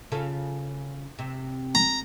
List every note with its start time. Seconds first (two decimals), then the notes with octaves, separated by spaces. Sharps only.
0.12 C#3 F4 A4
1.19 C3
1.75 A#5